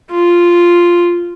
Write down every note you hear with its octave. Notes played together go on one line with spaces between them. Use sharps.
F4